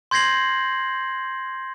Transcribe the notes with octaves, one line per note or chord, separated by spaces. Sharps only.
C6 G6 G#6 A#6 C7 F#7